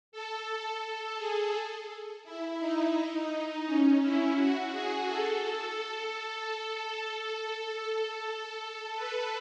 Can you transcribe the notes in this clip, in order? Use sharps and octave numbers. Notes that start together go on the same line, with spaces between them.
A4
A4
G#4
E4
D#4
C#4
E4
F#4
G#4
A4
A4
A4
A4
B4